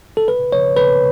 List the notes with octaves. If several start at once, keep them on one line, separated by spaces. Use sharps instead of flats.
A4
B4
C#5
B4